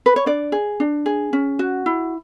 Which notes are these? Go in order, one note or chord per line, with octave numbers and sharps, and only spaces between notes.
B4
C#5
D4 D5
G#4
D4
G#4
C#4
F#4
E4